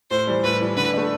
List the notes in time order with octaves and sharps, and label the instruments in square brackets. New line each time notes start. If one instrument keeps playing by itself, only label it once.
[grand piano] A2 [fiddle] C5
[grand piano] E3 G3
[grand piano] A2 [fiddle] B4
[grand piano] E3 G3
[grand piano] D3 [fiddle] B4
[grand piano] A3 D4